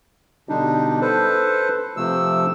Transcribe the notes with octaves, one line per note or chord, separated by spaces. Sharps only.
B2 D3 G3 D4 D#4
A4 B4 C5
C3 F3 A3 E6